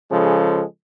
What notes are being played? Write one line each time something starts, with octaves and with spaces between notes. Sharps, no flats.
C#3 F3 G#3 A4